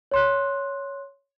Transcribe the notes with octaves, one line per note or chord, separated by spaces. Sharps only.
C#5 C6 F#6